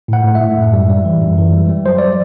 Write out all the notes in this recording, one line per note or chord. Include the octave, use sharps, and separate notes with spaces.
A2 F#5
A2
E5
A2
F#2
G3
G3
E3
F#2
E3
G3
G3
F#3 C5
D5